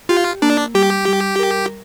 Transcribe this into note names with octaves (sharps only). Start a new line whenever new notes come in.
F4 G4
A#3 D4
G3 G4
G3
A#4